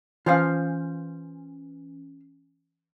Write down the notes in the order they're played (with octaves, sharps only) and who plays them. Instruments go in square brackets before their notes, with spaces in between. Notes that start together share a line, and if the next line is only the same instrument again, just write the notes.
[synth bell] E3 C#4 [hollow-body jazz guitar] F4 C5 F5